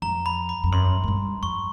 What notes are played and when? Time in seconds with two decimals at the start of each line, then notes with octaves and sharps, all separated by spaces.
0.02 F2 A#5
0.26 B5
0.49 B5
0.64 F2
0.72 F#2 C6
1.04 G#2
1.08 G2
1.43 F2 C#6